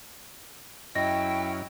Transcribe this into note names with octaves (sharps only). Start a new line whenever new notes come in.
F#2 C#4 E4 D#5 G5 A#6